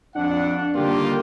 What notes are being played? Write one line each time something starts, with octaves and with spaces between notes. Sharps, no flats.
F2 D4 F#5
D3 D#3 G3 A#3 F4 G4